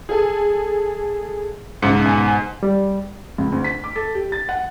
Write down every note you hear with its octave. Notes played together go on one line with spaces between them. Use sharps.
G#4 A4
B1 G#2 C#3 C#7
B2 G#5
G3
C#2
D2
B6
D6
A4
G4
A6
F#5